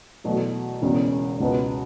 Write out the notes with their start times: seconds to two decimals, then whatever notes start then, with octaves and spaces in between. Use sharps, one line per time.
0.24 E2 B2 F#3 A3
0.82 E1 E2 C#3
1.40 C#2 B2 B3